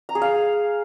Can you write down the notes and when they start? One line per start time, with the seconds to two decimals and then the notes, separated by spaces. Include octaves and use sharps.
0.09 A#5
0.15 G#4
0.22 F5